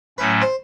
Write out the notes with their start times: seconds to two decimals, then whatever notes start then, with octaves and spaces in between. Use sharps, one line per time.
0.18 A2 F#3 A3 C#4 B4
0.42 C5